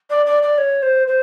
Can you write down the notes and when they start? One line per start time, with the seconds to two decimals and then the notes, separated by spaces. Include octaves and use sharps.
0.10 D5
0.26 D5
0.43 D5
0.58 C#5
0.82 C5
1.08 C5